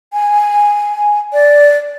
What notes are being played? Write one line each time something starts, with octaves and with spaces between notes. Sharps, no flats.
G#5
D5